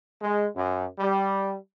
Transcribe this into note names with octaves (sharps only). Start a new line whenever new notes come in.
G#3
F#2
G3